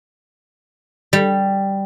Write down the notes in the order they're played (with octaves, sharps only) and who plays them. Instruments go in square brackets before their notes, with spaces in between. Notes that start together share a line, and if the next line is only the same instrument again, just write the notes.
[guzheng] G3